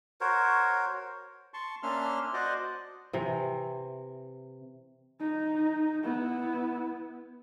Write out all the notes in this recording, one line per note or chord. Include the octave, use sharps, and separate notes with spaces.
F#4 A#4 C5 C#5
A5 C6 C#6
A#3 C#4 D4 E5 C6 F6
F#4 C5 D5 D#5
C3 E3
D#4
B3 E4